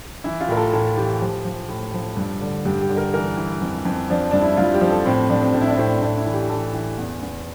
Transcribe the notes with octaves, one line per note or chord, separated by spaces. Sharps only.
E3 E4
F4
A2 A#4
A4
A2 A4
E3 G4
F3 G4
F3
A2
F3
G2
D3
G2 G4
G4
D3
A#4
E3 A#4
E3
F2
F2
F3 D4
G2 D4
E4
G2 F4
G4
F3
A4
A2 C4
F3 D4
C4
A2 D4
E4
D4
A2 C4
A2 D4
E4
E3
G4
E3 A4
E3
E2
E2